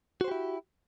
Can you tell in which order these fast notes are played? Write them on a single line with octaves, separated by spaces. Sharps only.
F#4 C5 G4 E4